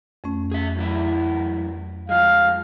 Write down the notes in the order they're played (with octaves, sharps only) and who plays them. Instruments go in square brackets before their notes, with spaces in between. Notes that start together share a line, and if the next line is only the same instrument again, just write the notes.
[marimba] F2 A3 C#4
[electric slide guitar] G#4 E5
F#2 E3 E4
[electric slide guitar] F3 G#3 [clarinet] F5